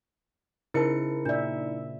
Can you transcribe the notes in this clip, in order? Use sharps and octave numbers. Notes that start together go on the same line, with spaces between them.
C#3 D#4 E4 A#4 C5 D#5 A5 C#7
A#2 D4 D5 E5